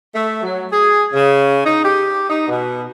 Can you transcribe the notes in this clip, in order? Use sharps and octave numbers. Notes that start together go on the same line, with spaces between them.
A3
F#3
G#4
C#3
D#4
G4
D#4
B2